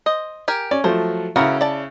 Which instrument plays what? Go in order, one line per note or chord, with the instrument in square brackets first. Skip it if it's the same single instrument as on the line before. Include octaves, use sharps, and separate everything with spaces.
[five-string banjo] C5 D#5
G4 A#4 G#5
[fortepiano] C#4 [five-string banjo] D5
[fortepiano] F3 F#3 A3 [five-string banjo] C5
[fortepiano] C#3 E4 [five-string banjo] B3 F#4 A#4
[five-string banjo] D5 A5